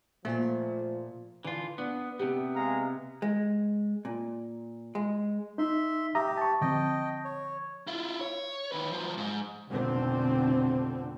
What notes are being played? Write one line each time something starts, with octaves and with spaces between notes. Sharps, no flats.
A#2 F3 A3
D3 E3 F4
B3 D4
C3 B3 G4
G#3 F5 A#5
G#3
A#2
G#3
D#4 E5 C6
G4 E5 A#5 D#6
A5 C#6
D3 F3 C4 D#5 G5
C#5
E4 F4
C#5
D#3 B4
F3 F#3
G#2
F1 B1 D3 C4